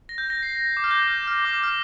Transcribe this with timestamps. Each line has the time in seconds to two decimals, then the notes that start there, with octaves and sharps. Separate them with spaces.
0.09 A#6
0.18 G6
0.30 A#6
0.43 C7
0.77 D6
0.84 F6
0.91 G6
1.27 F6
1.45 D6
1.64 F6